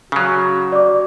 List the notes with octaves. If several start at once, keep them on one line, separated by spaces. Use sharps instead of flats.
C#3 F#3 F#4
D5 D6